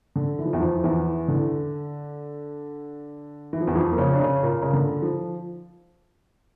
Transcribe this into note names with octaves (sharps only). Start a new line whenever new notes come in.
D3
E3
F3
E2 E3
F2 F3
E2 E3
D3
E3
F3
E2 E3
F2 F3
A#3
C#3 C#4
D4
C#3 C#4
A#2 A#3
C#3
D3
F3